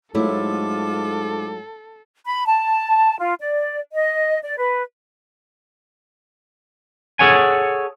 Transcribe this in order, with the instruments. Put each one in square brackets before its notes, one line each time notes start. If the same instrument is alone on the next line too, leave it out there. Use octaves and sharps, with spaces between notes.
[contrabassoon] G#2 [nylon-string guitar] F#3 A3 E4 [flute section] F4 D6 [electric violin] A4
[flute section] B5
A5
F4
D5
D#5
D5
B4
[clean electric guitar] G#4 A4 C#5 F#5 G#5